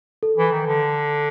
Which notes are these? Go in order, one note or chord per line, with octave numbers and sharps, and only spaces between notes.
A4
E3
D#3
D3